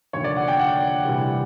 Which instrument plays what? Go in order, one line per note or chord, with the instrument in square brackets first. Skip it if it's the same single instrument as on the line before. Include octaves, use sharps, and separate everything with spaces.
[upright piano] F1 D#2 D3 C#5
D5
F#5
G5
F#5
D2 C3 E3 G3